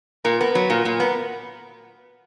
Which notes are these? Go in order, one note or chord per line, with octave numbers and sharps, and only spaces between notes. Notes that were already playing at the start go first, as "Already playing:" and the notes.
A#2 A#4
B3 A#4
F#3 B4
A#2 A#4
A#2
B3